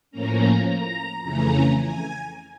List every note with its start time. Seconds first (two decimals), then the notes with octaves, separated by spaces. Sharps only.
0.11 A2 F3 A#3 C#4 A#5
0.66 A#5
1.20 F2 C#3 E3 A3 C#4 A#5
1.76 G#5